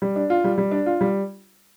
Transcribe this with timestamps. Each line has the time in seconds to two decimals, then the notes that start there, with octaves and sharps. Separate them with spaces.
0.02 G3
0.16 D4
0.30 F4
0.44 G3
0.58 G3
0.71 D4
0.86 F4
1.01 G3